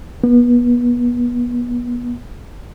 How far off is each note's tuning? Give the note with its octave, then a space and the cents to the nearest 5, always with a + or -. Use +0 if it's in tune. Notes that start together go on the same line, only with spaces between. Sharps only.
B3 -30